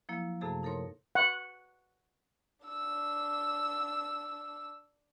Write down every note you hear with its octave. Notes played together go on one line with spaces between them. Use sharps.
F3 F#3 A#3 E4
F#2 C3 A3 G#4 A4 A5
D#4 A4 A#4 C#5 C6
F#5
D4 E6